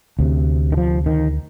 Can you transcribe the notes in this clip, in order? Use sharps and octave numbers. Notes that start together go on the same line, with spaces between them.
D2 C3
D#3
F3
D#3